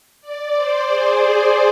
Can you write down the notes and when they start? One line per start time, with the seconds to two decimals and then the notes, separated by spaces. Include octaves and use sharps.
0.21 D5
0.55 C5
0.87 G#4
1.20 G#4